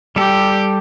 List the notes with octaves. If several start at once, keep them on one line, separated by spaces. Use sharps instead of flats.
G3 G4 A4